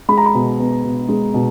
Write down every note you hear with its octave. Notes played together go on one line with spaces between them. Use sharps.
G#3 B5
A#5
B5
B2
B3
B2
G#3
B2